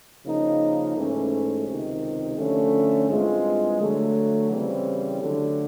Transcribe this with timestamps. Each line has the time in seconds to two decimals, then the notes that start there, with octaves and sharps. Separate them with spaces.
0.25 C#3 F3 A#3 D#4
0.95 G#2 E3 A3 C#4
1.67 C#2 C3 D#3
2.37 D3 F3 A3 C#4
3.08 G2 E3 G#3 C4 F4
3.79 D3 F#3 A3
4.50 C#3 E3 G3 C4
5.20 D3 F#3 A3